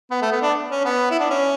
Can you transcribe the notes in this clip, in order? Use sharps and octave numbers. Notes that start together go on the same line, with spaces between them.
B3
A3
B3
D4
C#4
B3
E4
D4
C#4